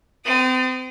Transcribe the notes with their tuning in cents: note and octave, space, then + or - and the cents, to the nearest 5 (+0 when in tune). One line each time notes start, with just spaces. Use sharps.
C4 -35 D#6 +0